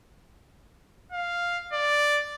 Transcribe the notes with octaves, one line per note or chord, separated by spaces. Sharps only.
F5
D5